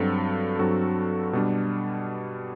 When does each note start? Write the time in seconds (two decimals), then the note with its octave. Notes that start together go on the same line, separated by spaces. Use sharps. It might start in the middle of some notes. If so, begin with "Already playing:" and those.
Already playing: G2 F#3 C4 F#4 A4
0.59 G2 F#3 C4 F#4 A4
1.33 B2 G3 D4